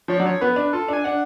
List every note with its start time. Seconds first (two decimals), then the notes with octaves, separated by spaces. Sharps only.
0.08 F3 C#5
0.18 F#3 D5
0.25 F3 C#5
0.41 B3 B4
0.56 D4
0.73 F4 A4
0.88 D4 G#5
1.04 D4 F#5